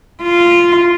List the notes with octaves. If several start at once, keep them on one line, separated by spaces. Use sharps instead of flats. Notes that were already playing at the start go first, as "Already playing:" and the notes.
F4